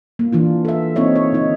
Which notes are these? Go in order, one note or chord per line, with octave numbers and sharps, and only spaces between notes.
A#3
E3 D4 F4
A4 E5
A#3 C4 D#4 C#5 E5
C#5
D3 D#4